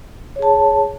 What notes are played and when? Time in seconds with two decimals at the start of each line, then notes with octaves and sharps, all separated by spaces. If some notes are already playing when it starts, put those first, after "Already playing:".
0.36 C#5
0.39 G#4
0.42 A5